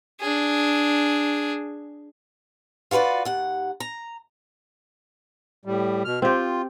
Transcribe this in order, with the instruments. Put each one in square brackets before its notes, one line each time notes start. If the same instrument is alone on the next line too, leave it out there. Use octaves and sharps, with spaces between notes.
[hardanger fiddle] D4 G#4
[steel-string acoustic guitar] F4 F#4 A#4 B4 D5
D#2 F#5
A#5
[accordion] A2 G3
B2 F6
[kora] C4 G4 [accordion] F4